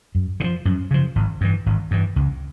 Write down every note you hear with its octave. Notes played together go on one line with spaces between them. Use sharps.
F#2
C#3
F3
F#2
C#3 F3
G#1
G2 E3
G#1
G2 E3
C#2